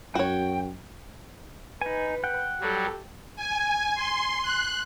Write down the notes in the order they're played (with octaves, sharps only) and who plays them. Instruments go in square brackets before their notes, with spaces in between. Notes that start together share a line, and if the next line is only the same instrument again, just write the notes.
[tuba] F#2 [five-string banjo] F#4 C#5 [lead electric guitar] G5
[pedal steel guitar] D#4 G#5 [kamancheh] B4
[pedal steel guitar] F#5 G5
[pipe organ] F#3 G3 [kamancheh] G4 A4
[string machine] G#5
C6
F#6